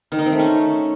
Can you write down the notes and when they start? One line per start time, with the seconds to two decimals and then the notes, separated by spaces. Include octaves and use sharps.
0.12 D#3
0.19 D#4
0.25 C4
0.32 A3
0.39 C#4